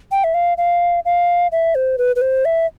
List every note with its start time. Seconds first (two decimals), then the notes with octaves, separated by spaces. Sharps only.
0.11 G5
0.24 E5
0.34 F5
0.58 F5
1.05 F5
1.52 E5
1.75 C5
1.98 B4
2.16 B4
2.21 C5
2.45 E5